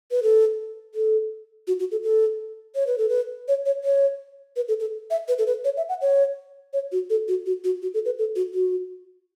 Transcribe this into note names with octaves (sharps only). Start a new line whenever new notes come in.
B4
A4
A4
F#4
F#4
A4
A4
C#5
B4
A4
B4
C#5
C#5
C#5
B4
A4
A4
E5
B4
A4
B4
C#5
E5
F#5
C#5
C#5
F#4
A4
F#4
F#4
F#4
F#4
A4
B4
A4
F#4
F#4